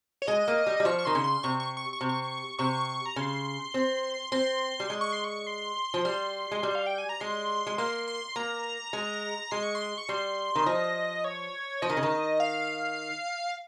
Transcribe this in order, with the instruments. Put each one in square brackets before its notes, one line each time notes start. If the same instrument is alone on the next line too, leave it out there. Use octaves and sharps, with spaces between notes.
[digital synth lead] C#5
[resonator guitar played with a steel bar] G#3 [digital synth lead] D#5
[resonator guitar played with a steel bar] A#3
G3
G3
[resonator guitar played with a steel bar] F3 [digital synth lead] C#6
[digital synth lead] C#6
[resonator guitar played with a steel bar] D#3 [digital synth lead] C6
[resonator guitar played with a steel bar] C#3
[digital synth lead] C6
[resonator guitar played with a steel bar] C3 [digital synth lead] C#6
[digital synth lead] C#6
C#6
C#6
[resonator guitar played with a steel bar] C3
[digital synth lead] C#6
[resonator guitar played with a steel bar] C3 [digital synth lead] C#6
[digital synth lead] A#5
[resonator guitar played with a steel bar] C#3 [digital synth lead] C6
[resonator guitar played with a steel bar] C4
[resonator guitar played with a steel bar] C4 [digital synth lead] C6
[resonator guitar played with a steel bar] G3
G#3
[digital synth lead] C#6
C6
C#6
C6
[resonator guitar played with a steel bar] F3
[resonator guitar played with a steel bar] G3 [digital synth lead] C6
[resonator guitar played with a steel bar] G#3
G3
[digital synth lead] F5
G5
G#5
A#5
[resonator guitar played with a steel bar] G#3 [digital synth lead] C6
[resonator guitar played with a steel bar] G#3
[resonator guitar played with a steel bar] A#3 [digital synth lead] C6
[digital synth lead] C6
[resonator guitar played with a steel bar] A#3 [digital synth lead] A#5
[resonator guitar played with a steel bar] G#3
[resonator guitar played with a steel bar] G#3 [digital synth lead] C6
[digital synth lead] C#6
C6
C#6
[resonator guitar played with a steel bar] G3 [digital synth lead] C6
[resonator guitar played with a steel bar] D#3
[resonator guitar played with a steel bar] F3 [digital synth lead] D#5
[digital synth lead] C#5
[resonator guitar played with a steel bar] F3 [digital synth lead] D#5
[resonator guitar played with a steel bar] D#3
C#3
D#3
[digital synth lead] F5